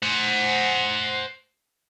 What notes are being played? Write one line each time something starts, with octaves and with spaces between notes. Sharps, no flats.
C5 F#5